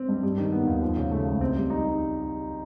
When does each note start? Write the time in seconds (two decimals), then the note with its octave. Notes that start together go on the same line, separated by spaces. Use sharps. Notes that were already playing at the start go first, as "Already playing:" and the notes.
Already playing: C4
0.09 G2
0.23 G3
0.38 D#3
0.52 B3
0.67 D#2
0.82 F3
0.97 C#3
1.11 A3
1.26 C#2
1.41 C4
1.56 G3
1.70 D#4